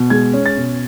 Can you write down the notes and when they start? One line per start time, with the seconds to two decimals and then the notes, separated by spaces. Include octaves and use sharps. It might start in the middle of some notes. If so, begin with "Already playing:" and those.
Already playing: B2
0.10 G#3 G#6
0.34 C#4
0.46 A6
0.57 B2